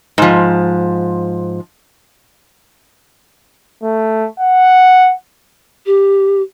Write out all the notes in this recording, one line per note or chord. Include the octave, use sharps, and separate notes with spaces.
G#2 F3
A3
F#5
G4